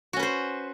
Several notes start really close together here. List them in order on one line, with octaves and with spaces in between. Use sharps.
F#4 C#4 B4 C5